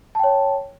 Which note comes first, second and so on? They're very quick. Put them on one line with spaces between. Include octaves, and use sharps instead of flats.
A5 G5 C#5